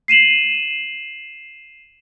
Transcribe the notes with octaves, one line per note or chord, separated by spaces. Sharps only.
C7 D#7 E7 F#7